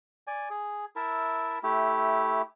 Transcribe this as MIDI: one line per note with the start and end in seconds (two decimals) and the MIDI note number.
0.27 0.49 74
0.27 0.49 80
0.50 0.85 68
0.96 1.59 64
0.96 1.59 70
0.96 1.59 76
0.96 1.59 81
1.63 2.42 57
1.63 2.42 64
1.63 2.42 67